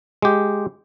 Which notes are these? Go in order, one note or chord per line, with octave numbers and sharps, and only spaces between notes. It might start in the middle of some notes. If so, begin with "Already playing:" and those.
G#3 G4